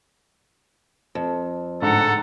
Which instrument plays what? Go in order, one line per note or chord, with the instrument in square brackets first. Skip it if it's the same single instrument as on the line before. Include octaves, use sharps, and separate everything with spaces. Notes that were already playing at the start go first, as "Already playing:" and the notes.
[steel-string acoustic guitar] F2
[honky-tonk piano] A1 G#2 D3 [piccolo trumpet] A4 [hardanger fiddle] F#5 A#5